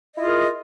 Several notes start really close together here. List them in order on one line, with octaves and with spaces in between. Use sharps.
D#5 E4 F4 G#4 A#4